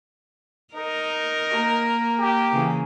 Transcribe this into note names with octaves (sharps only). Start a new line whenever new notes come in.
D#4 A#4
A#3
G4
C#3 E3